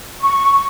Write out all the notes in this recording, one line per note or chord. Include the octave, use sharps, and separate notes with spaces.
C#6